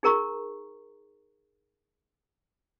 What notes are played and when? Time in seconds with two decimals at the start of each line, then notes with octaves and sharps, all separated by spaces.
0.03 D#4 G#4 A#4 A#5 C#6